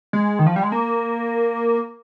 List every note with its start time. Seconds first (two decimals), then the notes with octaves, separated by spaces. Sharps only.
0.13 G#3
0.39 D#3
0.46 F3
0.56 G3
0.63 G#3
0.72 A#3